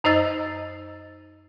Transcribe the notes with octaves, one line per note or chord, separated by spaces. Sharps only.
F#2 D#4 C5 D#5 E6 A6